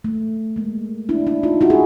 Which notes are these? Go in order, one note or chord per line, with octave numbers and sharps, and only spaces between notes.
A3
G#3 A#3
D4 E4
D4 E4
D#4 F4
E4 F#4
G#4